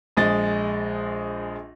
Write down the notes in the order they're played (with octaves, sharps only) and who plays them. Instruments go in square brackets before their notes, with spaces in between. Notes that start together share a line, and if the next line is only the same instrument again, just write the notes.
[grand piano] A#1 G#3 D#5 A6